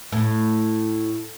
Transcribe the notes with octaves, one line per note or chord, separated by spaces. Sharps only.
A2